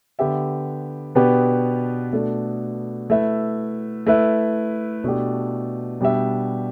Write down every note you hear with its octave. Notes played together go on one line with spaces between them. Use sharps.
D3 B3 G4 E5
B2 B3 D4 G4 B4
B2 A3 D4 A4
A3 E4 B4 E5
A3 E4 B4 E5
B2 A3 D4 G4
B2 G3 D4 G4 E5